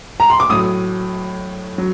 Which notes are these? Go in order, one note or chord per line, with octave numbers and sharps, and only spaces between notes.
A#5
C6
D6
A2 F#3 D#6
F#3